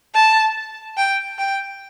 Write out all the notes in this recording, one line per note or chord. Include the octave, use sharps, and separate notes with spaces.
A5
G5
G5